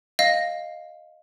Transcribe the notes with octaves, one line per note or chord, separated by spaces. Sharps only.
D#5 F5 A#6